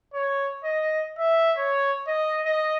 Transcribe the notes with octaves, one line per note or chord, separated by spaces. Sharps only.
C#5
D#5
E5
C#5
D#5
D#5